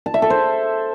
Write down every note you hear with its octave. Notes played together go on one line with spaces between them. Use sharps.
A5
E5
A4
C5